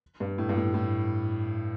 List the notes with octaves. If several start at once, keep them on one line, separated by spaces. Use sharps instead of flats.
G2
A2
G2
A2
A2